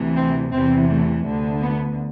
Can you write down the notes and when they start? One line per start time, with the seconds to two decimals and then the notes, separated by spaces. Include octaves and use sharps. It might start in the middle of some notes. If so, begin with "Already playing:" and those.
Already playing: D2 C3 E3
0.16 C4
0.53 E2 C3 E3 C4
0.89 A3
1.26 D2 D3
1.62 B3